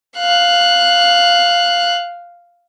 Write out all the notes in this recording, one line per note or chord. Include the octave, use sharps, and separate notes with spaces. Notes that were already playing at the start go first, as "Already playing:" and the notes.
F5 F#6